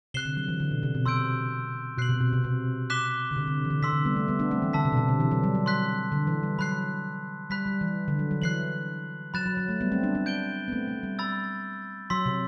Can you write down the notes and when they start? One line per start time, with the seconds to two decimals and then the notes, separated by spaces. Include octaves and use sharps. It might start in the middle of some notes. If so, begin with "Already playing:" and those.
0.14 C3 F#6 C7 E7 G7
0.25 D3
0.37 F#3
0.48 E3
0.60 D3
0.71 B2
0.83 C3
0.95 B2
1.06 C3 C6 E6 G6 D7
1.98 B2 F#6 C7 F#7
2.09 C3
2.21 B2
2.33 C3
2.44 C3
2.90 D6 F#6 B6 E7 G7
3.31 D3
3.36 C3
3.47 D3
3.65 E3
3.70 D3
3.82 C3 C6 E6 B6
3.93 D3
4.05 G3 B3
4.16 A3
4.28 G3 B3
4.39 B3 D4
4.51 A3 C4
4.62 E3
4.73 D3 A5 E6 B6
4.85 C3
4.92 B2
4.97 C3
5.09 D3
5.20 E3
5.31 F#3
5.43 G3
5.55 F#3
5.66 C6 F#6 B6
6.12 D3
6.27 E3
6.43 G3
6.58 F#3 B5 F#6 C7
7.50 G3 B5 F#6 B6
7.66 G3
7.81 E3
8.08 D3
8.19 F#3
8.31 F#3
8.42 E3 F#6 C7 F#7
9.34 F#3 B5 F#6 A6 E7
9.46 F#3
9.57 F#3
9.69 A3
9.80 G3 B3
9.92 A3 C4
10.03 B3 D4
10.15 B3 D4
10.26 G6 D7 G7
10.68 B3
10.72 A3 C4
10.88 A3
11.03 G3
11.19 B5 E6 A6
12.10 F#3 C6 E6 B6
12.26 C3